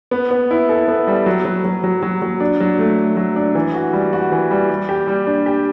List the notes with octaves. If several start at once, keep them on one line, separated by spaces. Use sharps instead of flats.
B3
B3
E4
A4
B3
G3
F#3
F#3
F#3
F#3
F#3
F#3
D4
F#3
A3
A3
F#3
D4
E3
F#4
G3
F#4
E3
G3
G3
G4
G3
D4
G4